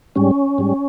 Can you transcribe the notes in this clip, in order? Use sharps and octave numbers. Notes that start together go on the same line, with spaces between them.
G#2 G3 C#4
G#2 G3